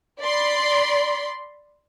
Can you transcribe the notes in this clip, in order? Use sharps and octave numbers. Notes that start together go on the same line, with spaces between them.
D5 B5 C6